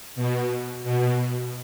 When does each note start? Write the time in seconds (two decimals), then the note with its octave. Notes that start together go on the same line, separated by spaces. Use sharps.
0.16 B2
0.84 B2